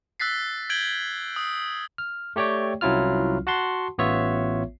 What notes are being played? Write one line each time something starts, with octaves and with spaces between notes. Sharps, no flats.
E6 F#6 A6 B6 C7
G6 G#6 D7 F#7 G7
D#6
F6
A3 G4 C#5 D5 G5
C2 F#3 C#4 E4 F4 F6
F#4 F#5 A5 C6
A1 B3 F4 C#5 E5